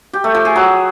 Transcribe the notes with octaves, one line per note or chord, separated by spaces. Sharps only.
G4
A3
F3
G#4
F#3